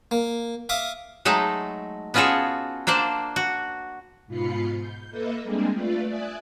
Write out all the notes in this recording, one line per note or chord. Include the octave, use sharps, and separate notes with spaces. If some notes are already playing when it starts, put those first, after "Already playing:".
A#3
E5 F5 D6 D#6
F#3 G#3 A3 D#4 A4
B3 C#4 F4 F#4 G#4 A4
A#3 D4 C5 D5 A5
F#4
G#2 B2 F4 B5 C7 C#7
G6
A#3 A4 B4 D#5 E5
G3 G#3 A#3 C4 D4 G#4
A3 F4 B4 D5
D5 E5 G#5 D#6 F#6